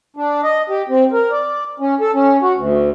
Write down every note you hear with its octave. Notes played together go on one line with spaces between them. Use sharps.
D4
D#5
G4
C4
A#4
D5
C#4
A4
C#4
F#4
D2